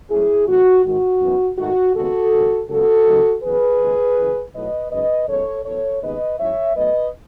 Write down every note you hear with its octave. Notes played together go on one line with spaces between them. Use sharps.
G#2 F#3 A3 C#4 E4 G#4
A1 A2 F#3 C#4 F#4
G#2 D#3 G#3 F#4
F#2 E3 B3 D#4
G#2 D#3 A3 D#4 F#4
D#2 C#3 G#3 B3 F#4 A4
G#1 F#2 C#3
C#2 C#3 F#3 B3 F#4 A4
D#2 C#3 F#3 A3 D#4
E2 C#3 F#3 G#4 B4
D#2 C#3 G#3
F#1 F#2 E3
B1 B2 F#3 A3 E4 B4 D#5
F#2 C#3 G#3 D#4 B4 D#5
F#2 D#3 G#3 B3 D#4 A4 C#5
A1 A2 F#3 B3 A4 C#5
D#2 C#3 G#3 B3 D#4 B4 D#5
G#2 F#3 C#4 E4 C#5 E5
B1 B2 F#3 A3 B4 D#5